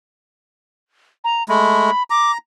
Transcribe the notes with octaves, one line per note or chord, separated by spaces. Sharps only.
A#5
G#3 A3 B5
A#5 D6